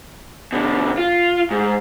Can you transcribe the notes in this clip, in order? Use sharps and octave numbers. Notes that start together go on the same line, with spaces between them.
B2 D3
F4
G#2